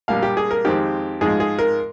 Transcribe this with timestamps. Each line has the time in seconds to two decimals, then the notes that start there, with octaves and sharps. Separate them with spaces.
0.08 A#1 A#2 G3 A#3 F5
0.22 G4
0.37 G#4
0.51 A#4
0.65 F2 D#3 G#3 C4 G4
1.21 G#2 F3 G#3 G#4
1.40 G#4
1.59 A#4